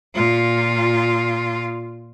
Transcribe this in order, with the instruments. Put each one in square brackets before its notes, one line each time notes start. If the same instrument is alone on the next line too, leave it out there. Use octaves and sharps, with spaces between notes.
[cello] A#2 F4